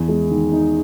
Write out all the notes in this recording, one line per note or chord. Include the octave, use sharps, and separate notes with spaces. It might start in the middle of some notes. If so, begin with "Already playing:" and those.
Already playing: E2
G#3
D#3
D#4